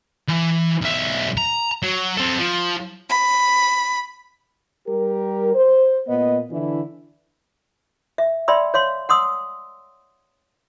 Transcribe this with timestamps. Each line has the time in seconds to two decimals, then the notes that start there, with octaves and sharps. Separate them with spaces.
0.28 E3
0.81 B1 E5
1.37 A#5
1.82 F#3
2.17 C4 A4
2.39 F3
3.08 B5
4.86 G3 G4 A#4
5.54 C5
6.08 A#2 B3 D#5
6.51 D3 E3 D4 E4
8.18 E5
8.48 D5 E5 G5 B5 C6 E6
8.74 C#5 F5 C6
9.09 F#5 C6 D#6 E6